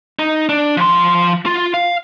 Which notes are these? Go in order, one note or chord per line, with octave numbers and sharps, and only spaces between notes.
D#4
D4
F3 C6
F4
F5